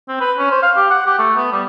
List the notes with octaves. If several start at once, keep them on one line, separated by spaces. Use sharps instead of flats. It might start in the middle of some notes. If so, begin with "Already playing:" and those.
C4
B4
C#4
C5
F5
G4
F#5
G4
A3
B3
G3